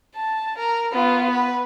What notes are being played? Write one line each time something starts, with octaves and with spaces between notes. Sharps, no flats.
A5
A#4
B3 F4
B4